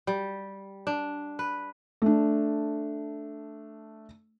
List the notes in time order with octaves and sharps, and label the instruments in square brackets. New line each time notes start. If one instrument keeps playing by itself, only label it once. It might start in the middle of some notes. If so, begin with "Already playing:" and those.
[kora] G3
D4
B4
[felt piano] A3 D4